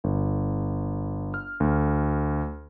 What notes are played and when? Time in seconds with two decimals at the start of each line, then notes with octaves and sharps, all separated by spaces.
0.04 G1
1.34 F6
1.60 D2